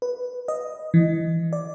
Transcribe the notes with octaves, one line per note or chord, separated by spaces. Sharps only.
B4
D#5
E3
D5